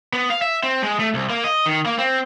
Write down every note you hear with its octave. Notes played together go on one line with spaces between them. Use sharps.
B3
F5
E5
C4
G#3
A3
C2
A#3
D#5
D#3
A#3
C4